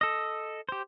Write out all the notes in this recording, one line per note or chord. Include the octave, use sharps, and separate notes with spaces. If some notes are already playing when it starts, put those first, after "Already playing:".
A4 D#5
G4 C5